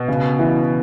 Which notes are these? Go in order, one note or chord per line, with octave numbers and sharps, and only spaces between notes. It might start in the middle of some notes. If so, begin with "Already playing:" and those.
Already playing: B2
C#3
E3